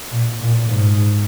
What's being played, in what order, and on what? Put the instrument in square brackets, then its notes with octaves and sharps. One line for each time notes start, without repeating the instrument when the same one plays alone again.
[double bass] A#2
A#2
G#2